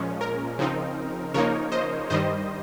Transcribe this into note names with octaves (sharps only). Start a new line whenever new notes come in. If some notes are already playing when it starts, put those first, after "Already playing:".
Already playing: A#2 F3 G#3 C#4
A#4
C#3 F3 C4 D#4
C#3 F3 A#3 D#4 A#4 C#5
C5 D#5
G2 D#3 G3 C5 D#5